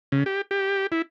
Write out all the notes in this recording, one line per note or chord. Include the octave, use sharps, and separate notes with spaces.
C#3
G4
G4
E4